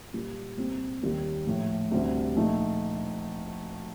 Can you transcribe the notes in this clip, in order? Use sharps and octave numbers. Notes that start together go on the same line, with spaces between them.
A#2 G3 A#3 F4
C2 A#2 G3 C4 G4
D#2 D#3 G3 A#3
A#1 A2 A3
D2 C3 G3 D4
A#1 A#2 A3 D#4